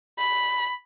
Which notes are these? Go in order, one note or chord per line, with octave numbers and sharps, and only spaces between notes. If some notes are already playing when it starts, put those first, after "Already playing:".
B5